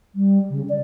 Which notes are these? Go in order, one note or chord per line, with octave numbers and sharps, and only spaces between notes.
G3
C#3
D5